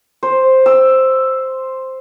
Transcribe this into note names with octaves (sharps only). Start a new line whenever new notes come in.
C5
E6